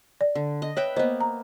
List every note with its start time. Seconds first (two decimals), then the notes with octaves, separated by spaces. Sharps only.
0.21 D5
0.35 D3
0.62 D#5
0.77 B4 C#5 E5 G5
0.96 A#3 B3 C5 D#5
1.21 A#5